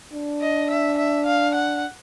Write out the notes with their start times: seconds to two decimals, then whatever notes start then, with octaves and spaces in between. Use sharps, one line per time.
0.13 D4
0.41 D#5
0.70 E5
0.97 E5
1.26 F5
1.55 F#5